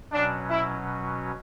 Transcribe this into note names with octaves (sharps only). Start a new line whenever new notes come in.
B2 F#3 C#4 D4
E4